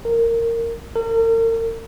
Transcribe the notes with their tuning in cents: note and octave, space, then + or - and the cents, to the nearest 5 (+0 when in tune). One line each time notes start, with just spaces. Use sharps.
A#4 -15
A#4 -40